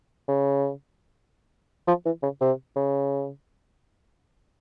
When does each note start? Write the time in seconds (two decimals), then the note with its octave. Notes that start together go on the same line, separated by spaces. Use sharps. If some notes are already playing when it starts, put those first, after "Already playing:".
0.28 C#3
1.87 F3
2.05 E3
2.23 C#3
2.41 C3
2.76 C#3